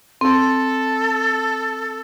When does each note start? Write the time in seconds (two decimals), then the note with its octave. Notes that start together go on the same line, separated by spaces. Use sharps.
0.21 C4 A4